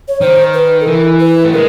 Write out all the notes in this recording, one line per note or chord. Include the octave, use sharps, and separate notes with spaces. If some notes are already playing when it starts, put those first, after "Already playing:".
C#5
D#3 C5
B4
A4
E3 A#4
B4
A3
G#3 A#4